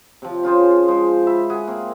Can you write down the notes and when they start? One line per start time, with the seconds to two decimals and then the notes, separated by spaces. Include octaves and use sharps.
0.22 C3 F3
0.43 C#4 F4 G#4 C5
0.88 F3 G#3 C5
1.27 E5 B5
1.50 F#4 G#4
1.68 A#3 C4